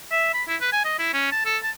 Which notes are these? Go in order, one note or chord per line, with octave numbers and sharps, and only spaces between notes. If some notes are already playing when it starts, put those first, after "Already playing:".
E5
B5
E4
B4
G#5
D#5
E4
C#4
A5
A4
A5